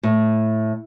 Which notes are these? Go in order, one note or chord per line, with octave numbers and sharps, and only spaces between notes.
A2